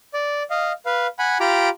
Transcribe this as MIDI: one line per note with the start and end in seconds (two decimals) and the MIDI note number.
0.14 0.43 74
0.50 0.72 75
0.50 0.72 77
0.86 1.07 71
0.86 1.07 77
1.19 1.38 78
1.19 1.38 80
1.19 1.38 83
1.40 1.69 65
1.40 1.69 67
1.40 1.69 82
1.40 1.69 83
1.40 1.69 86